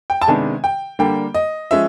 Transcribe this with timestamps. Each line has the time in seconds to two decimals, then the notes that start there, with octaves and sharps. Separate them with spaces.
0.10 G5
0.22 A5
0.28 C3 D#3 G#3 B3 D4 G#5
0.64 G5
0.99 D3 G3 A#3 D4 G5
1.34 D#5
1.71 F3 G#3 C#4 E5